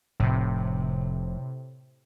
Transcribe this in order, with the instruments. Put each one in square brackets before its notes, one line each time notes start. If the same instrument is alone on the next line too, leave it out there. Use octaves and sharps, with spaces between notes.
[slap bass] F1 [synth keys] A2 C3